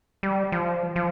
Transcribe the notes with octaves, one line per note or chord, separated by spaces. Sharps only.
G3
F3
F3